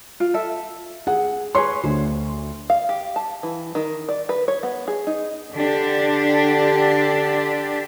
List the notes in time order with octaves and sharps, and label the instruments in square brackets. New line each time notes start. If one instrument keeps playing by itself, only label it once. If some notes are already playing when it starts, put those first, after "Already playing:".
[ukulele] F4
A4 E5
[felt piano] G#4 F#5
[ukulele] G#4 B4 C#5 [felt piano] C6
[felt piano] D2 [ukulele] C5
[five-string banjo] F5
G4
A5
E3
D#3
D5
B4
C#5
B3
G#4
D#4
[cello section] D3 D4 G4